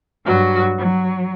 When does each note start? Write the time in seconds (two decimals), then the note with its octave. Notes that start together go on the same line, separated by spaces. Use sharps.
0.25 G2 F#3 F#4
0.77 F#3